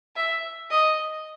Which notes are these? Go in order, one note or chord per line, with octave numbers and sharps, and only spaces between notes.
E5
D#5